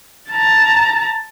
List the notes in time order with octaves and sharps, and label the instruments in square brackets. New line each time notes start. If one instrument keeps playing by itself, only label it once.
[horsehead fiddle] A5 A#5